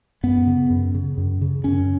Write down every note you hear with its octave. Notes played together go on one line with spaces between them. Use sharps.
F#2 B3
C#3
F#2
C#3
F#2
C#3
F#2 C#4